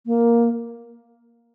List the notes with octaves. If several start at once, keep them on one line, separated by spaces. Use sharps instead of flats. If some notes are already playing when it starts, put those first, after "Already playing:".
A#3